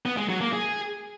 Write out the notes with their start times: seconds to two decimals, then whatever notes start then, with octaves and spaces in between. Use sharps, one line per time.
0.05 B3
0.17 G#3
0.29 F#3
0.41 A#3
0.53 G#4